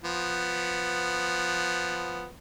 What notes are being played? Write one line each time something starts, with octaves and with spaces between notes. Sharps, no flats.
F3 B3